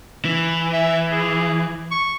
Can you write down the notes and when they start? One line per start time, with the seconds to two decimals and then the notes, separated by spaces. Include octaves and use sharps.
0.25 E3
0.73 E5
1.11 G#4
1.91 C#6